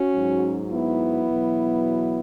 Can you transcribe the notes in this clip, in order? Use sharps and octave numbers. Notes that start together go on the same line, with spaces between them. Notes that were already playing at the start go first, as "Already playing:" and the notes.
Already playing: C#4 F#4
G#2 F#3
B3 E4
E2 B2 F#3